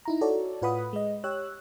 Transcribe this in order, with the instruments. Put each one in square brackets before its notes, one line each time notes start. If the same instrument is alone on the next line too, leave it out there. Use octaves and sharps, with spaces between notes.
[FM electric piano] D#4 E4 A#5
F#4 A4 C#5 D5
A2 F4 B4 F#5 B5 D#6
G#3 D#5
G4 C#5 E6 F#6